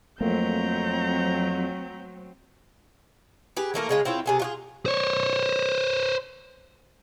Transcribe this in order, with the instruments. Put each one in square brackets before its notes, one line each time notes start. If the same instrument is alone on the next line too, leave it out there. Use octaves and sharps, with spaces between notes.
[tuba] F2 [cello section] F#3 C4 [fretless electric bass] A3 A#3 [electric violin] A#5 G6
[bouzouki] G4 G#4 B4
E3 A3 A#3 A#4
C#3 G#3 F4
C4 E4 F4 C#5
C3 G#4 A4
F4 F#4 G#4
[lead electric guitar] C5 C#5